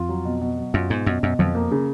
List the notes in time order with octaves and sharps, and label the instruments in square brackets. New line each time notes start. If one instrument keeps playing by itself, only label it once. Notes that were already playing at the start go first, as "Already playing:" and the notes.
Already playing: [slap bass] F2 [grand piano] F4
[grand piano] F#3
B2
B2
F#3
[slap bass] F#2 [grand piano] F4
[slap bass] G#2 [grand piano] B2
[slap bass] F#2 [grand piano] B2
[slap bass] F#2 [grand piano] B2
[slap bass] F2 [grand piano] F3
[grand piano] A#3
C#3